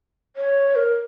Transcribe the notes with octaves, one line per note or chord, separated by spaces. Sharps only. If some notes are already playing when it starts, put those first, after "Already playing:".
C#5
A#4